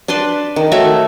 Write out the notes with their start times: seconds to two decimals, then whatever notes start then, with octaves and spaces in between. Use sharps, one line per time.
0.08 D4 B4 A5 C6
0.56 D#3
0.72 A3 F#4 C#5 E5